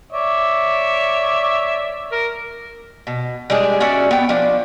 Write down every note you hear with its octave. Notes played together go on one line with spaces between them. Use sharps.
C#5 D5 E5
A#4
B2
G3 G#3 D4 G#4
C#4 F#4 D5 E5
B3 G5
F3 D4